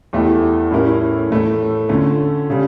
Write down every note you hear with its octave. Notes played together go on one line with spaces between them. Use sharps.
E2 E3 A3 E4 G4
A2 G3 C#4 E4 A#4
A2 E3 A3
D3 A3 C#4 F4
C#3 G3